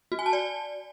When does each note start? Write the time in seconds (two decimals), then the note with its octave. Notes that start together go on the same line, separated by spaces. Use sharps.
0.12 F#4
0.19 G#5
0.26 A5
0.33 D5